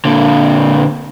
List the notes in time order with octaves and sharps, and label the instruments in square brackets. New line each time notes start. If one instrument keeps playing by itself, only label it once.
[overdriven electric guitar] A#2 D3